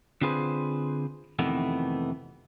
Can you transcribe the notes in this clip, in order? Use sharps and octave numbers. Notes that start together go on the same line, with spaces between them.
D3 C4 F4 G#4 B4 C5
F2 C3 D#3 E3 A3 B3